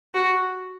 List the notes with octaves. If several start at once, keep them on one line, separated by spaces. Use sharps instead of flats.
F#4